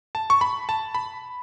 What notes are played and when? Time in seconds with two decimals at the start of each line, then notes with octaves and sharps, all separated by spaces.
0.15 A5
0.30 C#6
0.41 B5
0.69 A5
0.95 B5